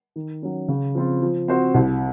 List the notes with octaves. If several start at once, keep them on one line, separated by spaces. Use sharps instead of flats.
D#3
F#3 C#4
C#3
F3 C4 F4
F3
C4 F#4 C5
C2